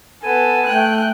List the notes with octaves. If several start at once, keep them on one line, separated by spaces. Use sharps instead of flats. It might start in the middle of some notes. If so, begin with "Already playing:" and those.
B3 A4 G#5
A3 G5 F#6